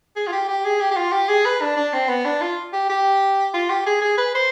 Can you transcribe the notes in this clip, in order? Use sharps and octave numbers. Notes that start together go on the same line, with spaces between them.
G#4
F4
G4
G4
G#4
G4
G4
F4
G4
G#4
B4
D4
D4
C4
B3
D4
F4
G4
G4
F4
G4
G#4
G#4
B4
C5